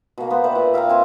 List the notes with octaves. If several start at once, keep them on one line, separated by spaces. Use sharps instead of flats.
B2 A#3
B3 C5
B4 D5 E5 G5
A#2
E5 F5 G5 A#5
A#3 C4 G#5